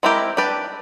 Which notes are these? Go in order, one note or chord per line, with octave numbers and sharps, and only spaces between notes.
G#3 C4 E4 G4 A#4
D4 G4 B4 D5